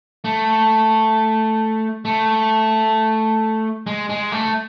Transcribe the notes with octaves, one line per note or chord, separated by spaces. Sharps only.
A3
A3
G#3
G#3
A3